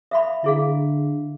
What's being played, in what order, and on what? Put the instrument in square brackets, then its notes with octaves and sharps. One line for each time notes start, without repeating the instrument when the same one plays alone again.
[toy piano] E5 F5 B5
[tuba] D3 [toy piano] E4 G#4 F5